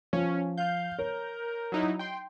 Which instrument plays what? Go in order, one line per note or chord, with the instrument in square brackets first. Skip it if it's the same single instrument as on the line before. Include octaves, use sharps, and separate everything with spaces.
[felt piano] F3 [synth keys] C#4
[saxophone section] F5 [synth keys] G6
[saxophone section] A#4 [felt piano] C#5
[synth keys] F#3 D#4 E4
G5 C6